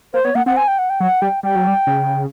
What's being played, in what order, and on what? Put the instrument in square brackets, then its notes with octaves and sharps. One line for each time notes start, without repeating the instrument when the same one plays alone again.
[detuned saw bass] A#3 [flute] C5
[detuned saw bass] B3 [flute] C#5
[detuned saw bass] A#3 [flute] F#5
[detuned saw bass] C4 [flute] F#5
[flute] G#5
G5
F#5
G5
[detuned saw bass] F#3 [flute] F#5
[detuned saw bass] G3 [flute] G5
[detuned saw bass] G3 [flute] G5
[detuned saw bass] F#3
G3
C#3